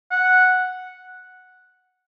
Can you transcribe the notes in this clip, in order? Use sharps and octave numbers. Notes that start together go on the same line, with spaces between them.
F#5